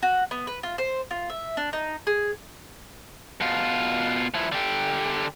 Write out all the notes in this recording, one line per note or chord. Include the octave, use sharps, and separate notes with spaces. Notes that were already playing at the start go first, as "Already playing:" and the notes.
F#4
B3
B4
F4
C5
F4
E5
D4
D#4
G#4
B2 F4
F3 E4
D3 G4